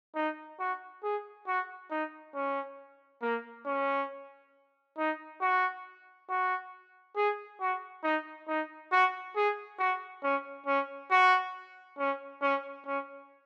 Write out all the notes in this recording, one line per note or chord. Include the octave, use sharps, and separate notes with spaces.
D#4
F#4
G#4
F#4
D#4
C#4
A#3
C#4
D#4
F#4
F#4
G#4
F#4
D#4
D#4
F#4
G#4
F#4
C#4
C#4
F#4
C#4
C#4
C#4